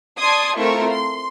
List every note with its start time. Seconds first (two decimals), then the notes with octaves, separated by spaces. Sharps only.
0.18 D5 A5 C6 D#6 G#6
0.58 A3 C4 E4 F4 A#4 C#6
0.90 C6